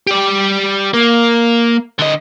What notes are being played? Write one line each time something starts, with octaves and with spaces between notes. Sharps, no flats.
G4 D5
A#3
D3 D#5